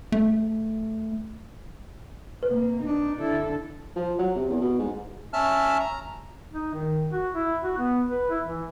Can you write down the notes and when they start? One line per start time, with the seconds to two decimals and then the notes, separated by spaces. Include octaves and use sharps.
0.12 A3
2.43 C3 A#3 B4
2.83 D4 D#4
3.18 D3 D4 E4 A4
3.96 F3
4.19 F#3
4.36 C3
4.50 E2
4.61 B2
4.79 G#2
5.33 C#4 E5 A5 F6
5.80 A#5
6.52 D#4
6.74 D#3
7.12 F#4
7.34 E4
7.63 F#4
7.78 B3
8.07 B4
8.30 E4
8.46 E3